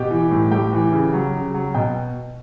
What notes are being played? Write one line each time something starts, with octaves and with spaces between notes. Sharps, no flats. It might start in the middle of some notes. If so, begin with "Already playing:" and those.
Already playing: B2 G4 G5
E3
A2
A2 G4 G5
E3
C#3
F#3
C#3
F#3
B2 G5